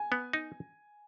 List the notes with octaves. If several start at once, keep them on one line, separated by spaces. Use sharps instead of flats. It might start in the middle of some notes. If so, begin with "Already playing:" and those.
Already playing: G#5
B3
D#4